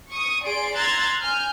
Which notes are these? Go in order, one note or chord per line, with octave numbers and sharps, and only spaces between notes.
C#6 D#6
G#4 D5 C6 D7
A#5 C6 E6 F#6 G#6 A6
G#5 F6 G6